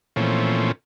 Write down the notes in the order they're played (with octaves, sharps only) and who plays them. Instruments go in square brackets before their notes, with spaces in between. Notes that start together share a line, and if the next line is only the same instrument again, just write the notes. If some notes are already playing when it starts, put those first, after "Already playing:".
[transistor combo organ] A#2 E3 F3 A3 C4 C#4